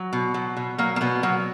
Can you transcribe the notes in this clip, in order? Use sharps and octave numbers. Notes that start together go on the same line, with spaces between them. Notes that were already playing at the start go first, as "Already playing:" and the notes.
Already playing: F#3
B2
F#3
B2
F#3 A#3
A#3
B2 B3
F#3 A#3